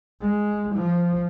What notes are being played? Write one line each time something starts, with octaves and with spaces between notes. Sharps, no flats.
G#3
F3